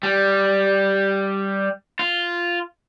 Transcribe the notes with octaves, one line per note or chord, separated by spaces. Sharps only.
G3
F4